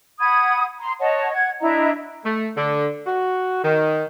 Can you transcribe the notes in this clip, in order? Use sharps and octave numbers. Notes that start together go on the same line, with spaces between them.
F#5 B5 D#6 G#6
A#5 C6
C#5 D#5 F#5 A5
F#5 G#6
D4 E4 D#5 A#5
A3
D3
F#4
D#3